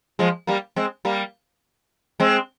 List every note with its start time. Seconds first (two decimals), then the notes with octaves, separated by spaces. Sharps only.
0.19 F3 G#3
0.47 G3 A#3
0.76 G#3 C4
1.05 G3 A#3
2.20 G#3 C4